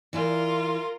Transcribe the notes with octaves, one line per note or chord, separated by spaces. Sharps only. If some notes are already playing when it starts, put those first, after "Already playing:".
E3 E4 F4 A#4 D5